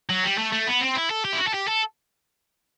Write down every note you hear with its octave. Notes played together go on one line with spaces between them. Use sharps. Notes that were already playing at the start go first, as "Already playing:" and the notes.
F#3
G3
A3
A3
B3
C4
E4
A4
G4
E4
F#4
A4
G4
A4